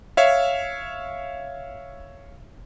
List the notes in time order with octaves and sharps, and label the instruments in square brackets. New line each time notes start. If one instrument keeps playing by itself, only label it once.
[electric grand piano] C#5 E5 F5